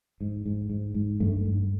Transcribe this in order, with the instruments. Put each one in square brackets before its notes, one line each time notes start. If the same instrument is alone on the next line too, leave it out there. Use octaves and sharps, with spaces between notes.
[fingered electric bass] G#2
G#2
G#2
G#2
G2 A3
G2